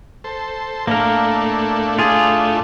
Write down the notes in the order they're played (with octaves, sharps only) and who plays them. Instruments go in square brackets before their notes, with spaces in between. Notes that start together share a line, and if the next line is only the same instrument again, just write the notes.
[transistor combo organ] A4 C5
[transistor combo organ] A2 A3 D4 [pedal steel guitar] A#3 A#4
[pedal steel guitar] F4 G#4